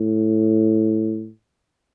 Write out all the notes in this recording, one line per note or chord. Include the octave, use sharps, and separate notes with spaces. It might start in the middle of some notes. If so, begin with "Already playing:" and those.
Already playing: A2